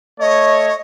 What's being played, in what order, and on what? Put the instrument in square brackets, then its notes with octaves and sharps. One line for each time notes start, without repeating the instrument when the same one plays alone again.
[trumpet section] A3 C#5 [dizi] D#5